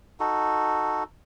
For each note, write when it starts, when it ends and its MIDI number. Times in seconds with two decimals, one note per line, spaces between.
0.20 1.03 63
0.20 1.03 66
0.20 1.03 69